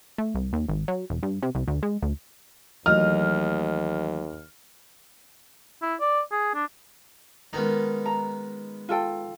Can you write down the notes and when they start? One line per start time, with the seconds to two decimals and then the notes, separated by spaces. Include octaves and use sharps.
0.18 A3
0.35 C2
0.53 D#2
0.69 G#1
0.88 F#3
1.10 E1
1.23 G2
1.43 C3
1.55 C2
1.68 D2
1.83 G#3
2.03 D2
2.86 D#2 E3 F#3 A3 D#5 F6
5.82 E4
6.00 D5
6.31 G#4
6.55 D4
7.53 D#3 G#3 B3 C#4 D#4
8.06 A#5
8.89 F4 A4 G5